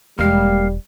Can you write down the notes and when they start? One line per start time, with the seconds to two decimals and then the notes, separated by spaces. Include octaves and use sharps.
0.19 E1 G3 G#3 A#3 F5